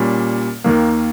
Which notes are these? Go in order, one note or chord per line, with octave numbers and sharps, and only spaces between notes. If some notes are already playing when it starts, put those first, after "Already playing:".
Already playing: A#2 G3 C#4
D#2 D#3 A#3